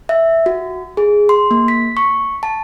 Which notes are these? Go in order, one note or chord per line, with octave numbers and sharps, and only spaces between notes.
E5
F#4
G#4
C6
A#3
B6
C#6
A5